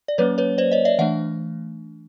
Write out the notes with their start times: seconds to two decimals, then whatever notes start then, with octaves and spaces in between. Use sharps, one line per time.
0.08 D5
0.18 F#3 A#3 C#4 B4 C#5
0.38 B4 C#5
0.58 C5 D5
0.72 C#5 D#5
0.85 D5 E5
0.99 E3 A3 D4 E5 F#5